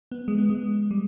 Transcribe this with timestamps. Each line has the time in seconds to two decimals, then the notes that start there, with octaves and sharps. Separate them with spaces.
0.11 B3
0.28 G#3
0.38 B3
0.50 G#3
0.91 G3